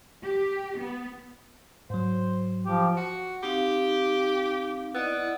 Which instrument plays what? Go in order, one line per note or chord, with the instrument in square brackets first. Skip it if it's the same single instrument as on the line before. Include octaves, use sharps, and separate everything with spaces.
[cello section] G4
B3
[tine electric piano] G#2 F#3 [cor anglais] C5
[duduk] F3 [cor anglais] G4
[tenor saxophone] F#4
[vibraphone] C4 D#4 F5 [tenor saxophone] G4
[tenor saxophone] B3 [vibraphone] E4 D5 D#5